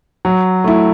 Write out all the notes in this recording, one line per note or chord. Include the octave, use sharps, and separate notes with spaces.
F#3
A3 E4